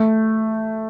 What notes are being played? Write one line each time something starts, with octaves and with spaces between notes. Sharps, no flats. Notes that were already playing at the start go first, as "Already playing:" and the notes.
Already playing: A3